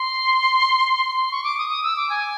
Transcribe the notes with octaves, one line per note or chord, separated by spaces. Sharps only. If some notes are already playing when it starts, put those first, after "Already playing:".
Already playing: C6
C6
C6
C#6
D6
D#6
D#6
E6
D6
G#5